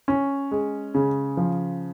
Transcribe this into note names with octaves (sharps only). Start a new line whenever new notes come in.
C#4
G#3
C#3
F3